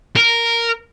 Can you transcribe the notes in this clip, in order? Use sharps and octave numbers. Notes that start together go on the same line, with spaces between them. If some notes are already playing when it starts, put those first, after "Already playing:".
A#4